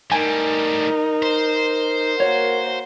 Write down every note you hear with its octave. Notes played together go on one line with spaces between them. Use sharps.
A2 G3 D#4 A#4 G#5
C5
A#3 F#4 C#5